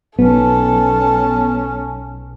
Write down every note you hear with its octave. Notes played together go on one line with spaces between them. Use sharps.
B1 B3 C#4 A4 A5